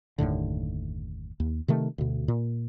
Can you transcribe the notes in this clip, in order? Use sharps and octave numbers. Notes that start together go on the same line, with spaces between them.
F#1 D#2 A2 D3
D#2
C3 D#3 A3
D2 B2
A#2